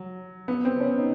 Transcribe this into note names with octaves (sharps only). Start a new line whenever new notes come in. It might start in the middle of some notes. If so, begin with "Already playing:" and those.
Already playing: F#3
B3
C4
C#4
D#4